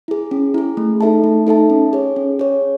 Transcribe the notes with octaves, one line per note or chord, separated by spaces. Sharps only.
E4 G#4
C#4
E4 G#4
A3
D#4 A4 E5 A5
A3
D#4 A4 E5 A5
C#4
G#4 C#5
C#4
G#4 C#5